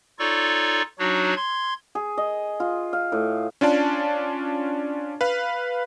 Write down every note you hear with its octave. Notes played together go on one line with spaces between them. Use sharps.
D#4 F4 A4 C#5 D5 C#6
F#3 D4 D#4 F#4 C#5
C6 G#6
G#4
D#5
F4
F5
A2
C#4 D4 F4 D5 A5
B4 F5